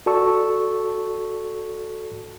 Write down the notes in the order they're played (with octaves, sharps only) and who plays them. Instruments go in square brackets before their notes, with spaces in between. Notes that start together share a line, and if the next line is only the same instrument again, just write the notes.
[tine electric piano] F#4 A4 D5 A5 C#6 E6